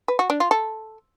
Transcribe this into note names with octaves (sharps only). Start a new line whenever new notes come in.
B4
F#4
D4
F4
A4